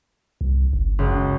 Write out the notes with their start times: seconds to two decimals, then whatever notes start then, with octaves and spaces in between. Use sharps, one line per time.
0.41 C2
0.73 G1
0.99 C#2 F#2